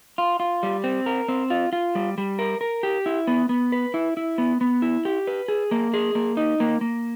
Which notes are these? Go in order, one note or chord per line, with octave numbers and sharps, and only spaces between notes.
F4
F4
G3
C4
A#4
C4
F4
F4
G3
G3
A#4
A#4
G4
E4
B3
B3
B4
E4
E4
B3
B3
E4
G4
B4
G#4
A#3
G#4
A#3
D#4
A#3
A#3